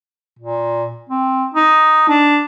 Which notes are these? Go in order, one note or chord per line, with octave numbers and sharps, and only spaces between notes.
A#2
C4
D#4
D4